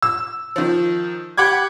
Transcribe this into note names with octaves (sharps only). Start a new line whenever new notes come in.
E6
D#3 F3
G4 F#5 B5 D6 G#6